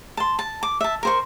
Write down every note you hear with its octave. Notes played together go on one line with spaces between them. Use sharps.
A5 C6
A5
D6
E5 A5
A#4 C5 C#6